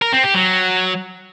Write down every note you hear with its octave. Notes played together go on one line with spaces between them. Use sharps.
A#4
C4
G4
F#3